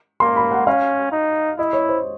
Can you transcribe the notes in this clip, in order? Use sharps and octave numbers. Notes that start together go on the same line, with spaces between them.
A#3 C6
B5
F#5
C#4 F5
D#4
E4 D#5
C#5
C5